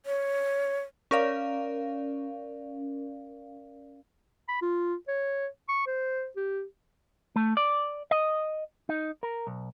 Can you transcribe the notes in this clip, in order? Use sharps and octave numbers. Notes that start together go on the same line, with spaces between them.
C#5
C#4 A#4 D5 F5
B5
F4
C#5
C#6
C5
G4
A3
D5
D#5
D#4
A#4
B1